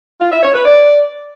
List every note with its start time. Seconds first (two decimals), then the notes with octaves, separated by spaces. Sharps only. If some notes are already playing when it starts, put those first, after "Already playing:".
0.21 F4
0.32 E5
0.43 C#5
0.54 B4
0.65 D5